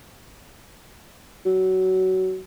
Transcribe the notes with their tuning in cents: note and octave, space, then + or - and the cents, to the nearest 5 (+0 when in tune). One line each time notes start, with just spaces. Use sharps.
F#3 +20